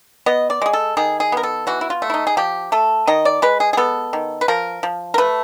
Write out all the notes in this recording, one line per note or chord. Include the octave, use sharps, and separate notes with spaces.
B3 D#5
D5
G#3 G#4
A4
D#3 G#4
G#4
B3 A#4
A4
E3 F#4
E4
F4
A3
E4
D#4
G#4
F3 G4
A3 A4
D#3 D#5
D5
G#3 B4
G#4
G#4
B3 A4
D#3
B4
F3 A#4
F3
A#4
A3 B4